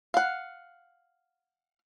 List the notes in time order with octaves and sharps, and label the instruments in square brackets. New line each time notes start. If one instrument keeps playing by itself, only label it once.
[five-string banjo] F5 F#5